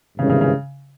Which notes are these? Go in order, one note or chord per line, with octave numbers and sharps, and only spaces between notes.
G#1 G2 C#3 E3 G#3 C#4
C#3
C#3